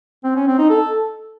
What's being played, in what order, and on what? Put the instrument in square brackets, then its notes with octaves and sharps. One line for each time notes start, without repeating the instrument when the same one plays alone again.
[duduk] C4
C#4
C4
D#4
A4